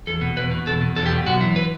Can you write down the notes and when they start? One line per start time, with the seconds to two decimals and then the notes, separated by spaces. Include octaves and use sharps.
0.07 E2 A4
0.21 B2
0.37 E2 B4
0.51 B2
0.66 E2 A4
0.81 B2
0.96 E2 A4
1.06 G4
1.11 B2
1.26 F#2 F#4
1.41 E3
1.56 B4